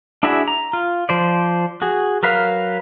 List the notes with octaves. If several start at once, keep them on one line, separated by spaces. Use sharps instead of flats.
D4 E4 F#4 G#4 E5
A#5
F4
F3 C5 D5
F#4 G#4
F#3 A#4 B4 F5